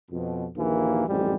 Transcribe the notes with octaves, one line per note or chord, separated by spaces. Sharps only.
F2 B2
A#1 D#2 E3 A#3
A1 F2 G#2 G3